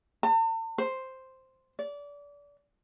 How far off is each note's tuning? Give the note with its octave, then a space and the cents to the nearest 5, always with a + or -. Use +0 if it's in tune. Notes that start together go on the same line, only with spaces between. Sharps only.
A5 +45
C5 +0
D5 -30